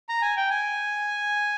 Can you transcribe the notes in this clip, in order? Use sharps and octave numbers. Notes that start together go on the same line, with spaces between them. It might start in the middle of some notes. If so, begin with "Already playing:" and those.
A#5
G#5
G5
G#5